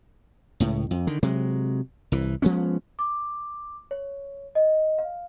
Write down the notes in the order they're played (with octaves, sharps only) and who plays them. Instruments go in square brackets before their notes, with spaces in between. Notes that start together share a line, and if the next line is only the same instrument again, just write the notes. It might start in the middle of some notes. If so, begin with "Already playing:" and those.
[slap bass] C#2 A2
F2
D3 D#3
C3 F#3 G#3
C2 E3
F3 G#3 B3 C#4
[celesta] D6
C#5
D#5
F5